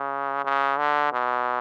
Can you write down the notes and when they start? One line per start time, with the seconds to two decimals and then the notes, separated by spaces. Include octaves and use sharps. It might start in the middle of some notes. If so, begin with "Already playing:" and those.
Already playing: C#3
0.45 C#3
0.78 D3
1.13 B2